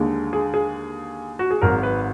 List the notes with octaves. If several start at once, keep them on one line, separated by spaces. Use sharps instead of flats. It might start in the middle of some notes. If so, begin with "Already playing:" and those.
Already playing: D#2 D3 G#3
G#4
G#4
F#4
G#4
G#1 G#2 F#3 A#4
B4